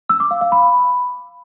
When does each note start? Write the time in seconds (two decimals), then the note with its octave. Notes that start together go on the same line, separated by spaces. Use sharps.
0.09 E6
0.20 D6
0.31 F5
0.41 F5
0.52 B5